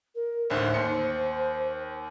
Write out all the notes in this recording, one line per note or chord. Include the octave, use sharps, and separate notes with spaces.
A#4
A1 D2 G#2 C5
D#2 C6 C#7